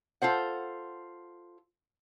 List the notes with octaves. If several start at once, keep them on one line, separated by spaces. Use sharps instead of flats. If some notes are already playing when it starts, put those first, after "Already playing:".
F4 A4 C5 F#5